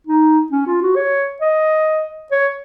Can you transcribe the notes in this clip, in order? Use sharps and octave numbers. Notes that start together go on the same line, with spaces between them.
D#4
C#4
F4
F#4
C#5
D#5
C#5